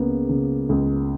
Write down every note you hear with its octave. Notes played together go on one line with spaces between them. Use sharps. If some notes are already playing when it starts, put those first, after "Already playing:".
Already playing: C#2 C#3 A#3 B3
C#3
C#2